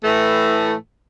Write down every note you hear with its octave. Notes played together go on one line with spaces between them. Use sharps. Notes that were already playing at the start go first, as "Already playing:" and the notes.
A2 E3 A3